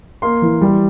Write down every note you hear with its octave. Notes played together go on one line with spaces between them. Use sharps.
A#3 C6
E3
G3